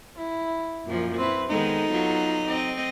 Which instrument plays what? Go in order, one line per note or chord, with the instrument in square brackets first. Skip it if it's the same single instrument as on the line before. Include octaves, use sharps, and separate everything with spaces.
[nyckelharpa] E4
[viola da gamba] F#2 F3 [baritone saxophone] A#2
[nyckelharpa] C4 E4 [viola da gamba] B4
[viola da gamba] D#3 G#3 B3 [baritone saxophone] D#4 [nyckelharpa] A4
[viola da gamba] F#3 B3 F4
C4 D#5